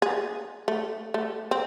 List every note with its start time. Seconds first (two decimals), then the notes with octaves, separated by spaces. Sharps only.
0.02 G#4
0.68 A3
1.14 A3
1.51 C4